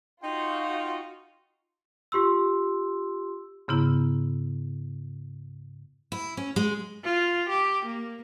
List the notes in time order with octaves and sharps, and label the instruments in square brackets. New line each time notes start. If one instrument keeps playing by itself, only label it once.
[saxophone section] D#4 [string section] F4 F#4 [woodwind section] G5 C6
[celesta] F4 G4 C6 E6
[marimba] G#2 C#3 B3 E4 A#5
[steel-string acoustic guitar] E4
C#4
G#3
[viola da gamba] F4
G4
A#3